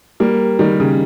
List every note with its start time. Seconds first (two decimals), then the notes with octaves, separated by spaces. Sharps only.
0.20 G3 A#3
0.59 D#3 G3
0.80 C#3